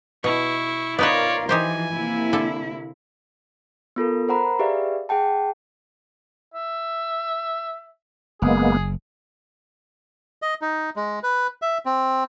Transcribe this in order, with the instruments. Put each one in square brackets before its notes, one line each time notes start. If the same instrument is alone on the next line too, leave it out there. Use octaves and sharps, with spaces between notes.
[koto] B2 [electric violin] E4 C#6
[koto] B3 D#4 B4 [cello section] F4 A#4 [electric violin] C#5 D5
[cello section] E3 F3 [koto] D#4 G4 C5 [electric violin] G#5
[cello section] C3 A#3 E4
[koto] D3 A4
[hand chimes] B3 F4 A4 A#4
A#4 C5 F#5 A#5 B5
G4 G#4 B4 D5 E5 F5
G#4 F#5 G5 A5
[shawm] E5
[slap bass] F#1 [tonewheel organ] G#3 A#3 B3 [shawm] G#4
[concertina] D#5
D#4
G#3
B4
E5
C4